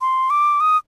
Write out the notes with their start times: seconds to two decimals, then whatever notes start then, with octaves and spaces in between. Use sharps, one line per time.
0.01 C6
0.30 D6
0.60 D#6